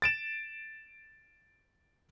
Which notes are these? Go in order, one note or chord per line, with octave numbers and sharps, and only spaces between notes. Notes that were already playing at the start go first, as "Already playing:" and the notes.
A6 D7 E7